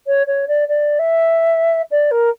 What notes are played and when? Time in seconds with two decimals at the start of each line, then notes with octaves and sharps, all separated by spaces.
0.07 C#5
0.27 C#5
0.48 D5
0.68 D5
0.99 E5
1.91 D5
2.11 A#4